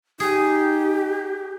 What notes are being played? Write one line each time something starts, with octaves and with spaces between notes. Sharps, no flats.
D#4 G4 G#4